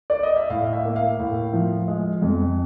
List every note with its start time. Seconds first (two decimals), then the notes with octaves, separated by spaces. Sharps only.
0.10 D5
0.23 D#5
0.36 E5
0.50 A2 F5
0.73 E5
0.85 A#3
0.96 F5
1.19 A2
1.53 F3
1.88 G#3
2.22 F2